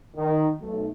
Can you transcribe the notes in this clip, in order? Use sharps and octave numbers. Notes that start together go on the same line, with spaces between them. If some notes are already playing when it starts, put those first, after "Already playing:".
D#3
B1 A3